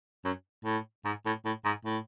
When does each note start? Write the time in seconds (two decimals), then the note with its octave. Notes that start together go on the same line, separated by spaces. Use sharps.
0.25 F#2
0.65 A2
1.05 G#2
1.26 A2
1.45 A2
1.65 G#2
1.85 A2